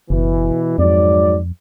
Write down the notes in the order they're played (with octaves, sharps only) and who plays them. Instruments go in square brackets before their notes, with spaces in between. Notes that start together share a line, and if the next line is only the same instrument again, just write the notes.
[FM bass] F#1 [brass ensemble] B2 E3
[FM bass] F2 [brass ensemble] G#2 F#3 D5